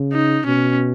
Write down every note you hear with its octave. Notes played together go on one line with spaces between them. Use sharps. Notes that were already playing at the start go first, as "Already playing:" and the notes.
Already playing: C#3
D#4
B2 C#4